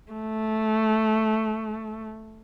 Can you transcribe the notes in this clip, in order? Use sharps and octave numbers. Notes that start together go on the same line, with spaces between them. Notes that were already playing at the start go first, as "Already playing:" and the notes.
A3